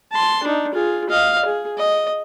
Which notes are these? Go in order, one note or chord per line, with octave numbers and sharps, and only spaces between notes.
A5 C6
D4 D#4
F4 G#4
D#5 F5
G#4
D#5